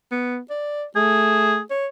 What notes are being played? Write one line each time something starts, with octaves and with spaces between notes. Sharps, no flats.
B3
D5
A3 G#4
C#5